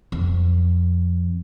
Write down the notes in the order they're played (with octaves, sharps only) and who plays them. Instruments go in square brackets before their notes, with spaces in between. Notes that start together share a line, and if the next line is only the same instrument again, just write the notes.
[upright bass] F2